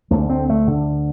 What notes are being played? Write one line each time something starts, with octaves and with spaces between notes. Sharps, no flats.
D2 D3 A3
C4
A3
D3